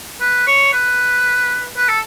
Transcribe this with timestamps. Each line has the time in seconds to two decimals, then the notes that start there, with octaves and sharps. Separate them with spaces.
0.20 B4
0.47 C#5
0.73 B4
1.77 B4
1.88 A4